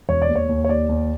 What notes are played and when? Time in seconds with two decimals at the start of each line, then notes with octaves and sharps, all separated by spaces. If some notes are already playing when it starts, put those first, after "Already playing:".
0.09 E1 C#5
0.22 D5
0.28 D#2
0.35 C#5
0.49 D#2
0.64 C#5
0.69 D#2 D5
0.89 D#2